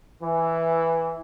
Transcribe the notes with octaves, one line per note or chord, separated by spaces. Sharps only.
E3